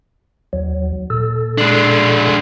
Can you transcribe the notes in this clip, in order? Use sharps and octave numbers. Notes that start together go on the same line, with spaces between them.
D#2 F#3
A#2 A4
G#3 D4